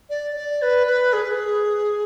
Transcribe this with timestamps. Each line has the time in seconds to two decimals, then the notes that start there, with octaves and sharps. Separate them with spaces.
0.10 D5
0.36 D5
0.62 B4
0.87 B4
1.13 G#4
1.22 B4
1.32 G#4